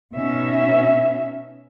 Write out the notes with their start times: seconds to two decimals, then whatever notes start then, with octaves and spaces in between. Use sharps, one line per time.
0.14 B2 C#4 D#4 E5